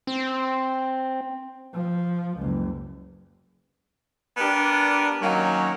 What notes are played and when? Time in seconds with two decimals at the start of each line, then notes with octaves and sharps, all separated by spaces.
0.07 C4
1.74 F3
2.38 F#1 C#2
4.37 B3 D4 G4 A#4
5.22 D#3 F#3 A#3 C#4